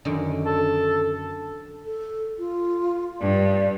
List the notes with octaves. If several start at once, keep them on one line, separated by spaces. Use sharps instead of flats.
F#2 D3 D#3
A4
A4
F4
G2 D5